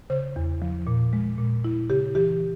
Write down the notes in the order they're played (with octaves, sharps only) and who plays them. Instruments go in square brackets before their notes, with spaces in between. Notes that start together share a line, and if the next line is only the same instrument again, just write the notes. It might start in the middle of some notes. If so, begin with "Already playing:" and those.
[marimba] C#3 C5
E2
F3
A#2
G#3
A#2
E4
C#3 G4
E3 G4